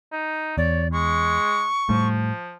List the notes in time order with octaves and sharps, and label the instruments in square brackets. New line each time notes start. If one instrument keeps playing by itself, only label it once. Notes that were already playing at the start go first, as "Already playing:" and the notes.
[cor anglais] D#4
[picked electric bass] E2 [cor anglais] C#5 [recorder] D5
[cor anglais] G#3 [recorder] C#6
[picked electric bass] A2 G3 A3 [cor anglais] F3